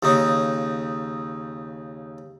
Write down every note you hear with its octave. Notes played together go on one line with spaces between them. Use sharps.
D#2 C#3 D#4